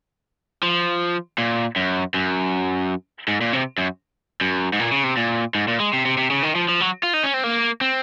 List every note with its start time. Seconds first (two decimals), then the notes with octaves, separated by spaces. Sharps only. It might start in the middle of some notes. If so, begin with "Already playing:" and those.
0.63 F3
1.38 A#2
1.76 F#2
2.14 F#2
3.28 G#2
3.41 A#2
3.53 C3
3.78 F#2
4.41 F#2
4.73 G#2
4.79 A#2
4.92 C#3
5.04 C3
5.17 A#2
5.55 G#2
5.68 A#2
5.80 G#3
5.93 C3
6.06 C3
6.18 C3
6.30 C#3
6.43 D#3
6.55 F3
6.69 F3
6.81 F#3
7.03 F4
7.14 D#4
7.24 C#4
7.34 C4
7.44 A#3
7.81 C4